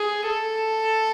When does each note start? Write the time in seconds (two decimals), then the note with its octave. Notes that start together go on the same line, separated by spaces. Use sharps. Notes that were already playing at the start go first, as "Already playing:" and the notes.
Already playing: G#4
0.27 A4